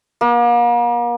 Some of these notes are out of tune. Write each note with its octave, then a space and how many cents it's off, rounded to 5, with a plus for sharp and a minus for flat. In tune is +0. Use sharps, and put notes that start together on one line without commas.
A#3 +40